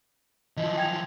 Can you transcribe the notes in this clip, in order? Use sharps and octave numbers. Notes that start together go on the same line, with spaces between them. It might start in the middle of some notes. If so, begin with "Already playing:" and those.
E3 F3 D#5
G5 G#6 F7